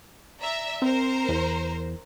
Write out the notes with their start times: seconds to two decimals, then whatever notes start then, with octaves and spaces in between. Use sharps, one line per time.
0.41 D5 E5 A#5
0.82 C4 A#4 C5 A#5
1.29 E2